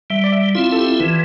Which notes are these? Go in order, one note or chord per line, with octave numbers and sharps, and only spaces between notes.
G3 E5
D5
E5
C4 E4 F4
A4
G4
E3 B4